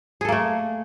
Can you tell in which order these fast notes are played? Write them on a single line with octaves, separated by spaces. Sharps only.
G#4 A4 A#3 A3